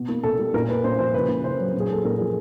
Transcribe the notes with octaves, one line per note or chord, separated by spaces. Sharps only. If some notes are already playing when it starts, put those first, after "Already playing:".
Already playing: B2
A#3
B2 A4
G3
A#2 A#4
A#3 B4
A#2 C5
F3 C5
C#3 B4
A#3
C#3 C5
F#3
A#2
G#4
A#3 A4
A#2 A#4
F3 G#4